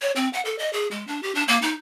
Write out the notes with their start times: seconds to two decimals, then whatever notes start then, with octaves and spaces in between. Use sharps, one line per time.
0.02 C#5
0.16 C4
0.33 F#5
0.45 A4
0.58 D#5
0.73 G#4
0.91 G#3
1.07 D4
1.23 G4
1.35 D4
1.48 A#3
1.62 D#4